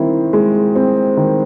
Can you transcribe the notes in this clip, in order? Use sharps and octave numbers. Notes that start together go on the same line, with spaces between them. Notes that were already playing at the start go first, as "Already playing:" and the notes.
Already playing: D#3 C4 E4
G#3
C4
D#3